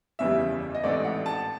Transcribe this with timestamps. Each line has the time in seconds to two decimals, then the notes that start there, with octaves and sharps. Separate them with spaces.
0.19 F#1 E2 C#3 E3 G3 E5
0.75 D#5
0.83 A1 G#2 E3 A3 C4 D5
1.04 F#5
1.26 A5